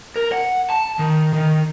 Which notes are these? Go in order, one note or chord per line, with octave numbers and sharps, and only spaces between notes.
A#4
F#5
A5
D#3
D#3